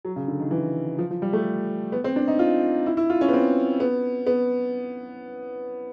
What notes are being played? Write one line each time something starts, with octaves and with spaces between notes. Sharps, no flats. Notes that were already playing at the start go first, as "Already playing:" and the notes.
F#3
C#3
D3
D#3
E3
F3
F3
G3
A3
B3
C4
D4
D#4
F4
E4
E4
F4
C#4
B3
C4
B3
B3